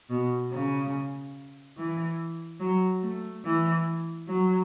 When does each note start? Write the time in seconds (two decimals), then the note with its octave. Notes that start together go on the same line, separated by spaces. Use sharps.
0.10 B2
0.52 C#3
1.77 E3
2.60 F#3
3.02 A3
3.44 E3
4.27 F#3